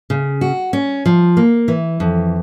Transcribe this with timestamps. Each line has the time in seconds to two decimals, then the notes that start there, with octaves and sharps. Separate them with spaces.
0.10 C#3
0.41 F#4
0.73 C#4
1.06 F3
1.37 A#3
1.68 E3
2.00 F2